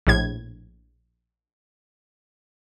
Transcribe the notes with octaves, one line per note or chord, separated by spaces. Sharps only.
A#1 A2 G#6